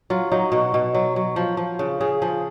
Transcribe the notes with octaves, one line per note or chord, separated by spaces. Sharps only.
F#3 F4
F#3 D#4
B2 F#4
B2
F#3
F#3
F3
F3
C#3
C#3 G#4
F3 G#4